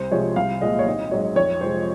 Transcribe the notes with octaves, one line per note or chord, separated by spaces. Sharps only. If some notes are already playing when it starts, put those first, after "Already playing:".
Already playing: C2 C5
C3 F3 G#3 C#5
C2 F5
A#2 G#3 D#5
C#5
G#1 D#5
G#2 F#3 C#5
F2 C#5
C3 F3 G#3 C5